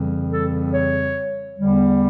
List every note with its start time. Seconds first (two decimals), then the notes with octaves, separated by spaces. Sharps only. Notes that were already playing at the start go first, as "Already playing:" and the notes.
Already playing: F2 C#3 E3 G3
0.31 A4
0.73 C#5
1.58 E2 D3 G3